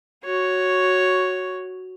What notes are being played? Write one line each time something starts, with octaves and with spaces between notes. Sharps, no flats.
F#4 C#5